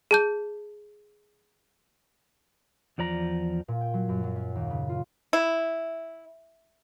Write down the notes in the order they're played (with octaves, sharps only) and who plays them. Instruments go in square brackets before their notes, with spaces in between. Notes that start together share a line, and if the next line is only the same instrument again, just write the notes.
[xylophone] G#4 A5 G6
[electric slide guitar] E2 F3 D5 A#5
[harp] A#2
G5
F#3
F#2
F#3
C#4
D#2
C#3
F4
[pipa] E4